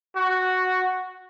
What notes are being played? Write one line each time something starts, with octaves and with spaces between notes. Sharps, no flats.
F#4